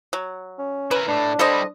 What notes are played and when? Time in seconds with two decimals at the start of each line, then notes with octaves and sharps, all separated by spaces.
0.13 F#3
0.59 C#4
0.91 E4 A#4 B4
1.08 A2 A3 D4
1.39 G3 E4 A4 C5 D#5